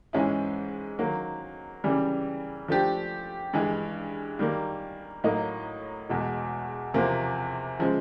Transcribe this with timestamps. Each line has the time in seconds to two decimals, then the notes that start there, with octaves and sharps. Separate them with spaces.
0.13 G#2 E3 G#3 C#4 E4
0.99 D#3 F#3 A#3
1.84 C#3 E3 G3
2.68 F3 A3 D4 G4
3.53 G2 E3 G#3
4.39 D#3 G3 A#3
5.24 A2 F#3 A#3 D#4
6.10 E2 B2 G#3
6.94 E2 C3 F3 A#3
7.79 C#3 F3 G#3